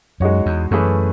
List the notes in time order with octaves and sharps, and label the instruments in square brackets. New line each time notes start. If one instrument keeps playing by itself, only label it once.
[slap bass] F#2 [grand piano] G#3 D#4 F#4 C#5
[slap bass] E2
[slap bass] F#2 [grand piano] E3 A3 C#4 G#4 B4